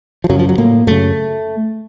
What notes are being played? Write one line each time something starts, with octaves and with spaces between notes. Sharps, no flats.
F3
F#2 C#3 F#3
F3
F#3
A2 A#3
F#2 C#3 A3